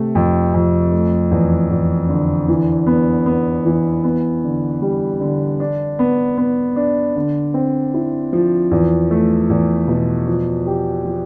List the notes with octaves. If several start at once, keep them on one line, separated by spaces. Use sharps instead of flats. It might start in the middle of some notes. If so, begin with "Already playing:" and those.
Already playing: C3 A3
F2
F2
A3
E2
E2
D3
E3
B3
B3
E3
B3
D3
G3
D3
D4
B3
B3
D4
D3
C4
E4
F3
E2
A3
E2
B2
F3
G4
F3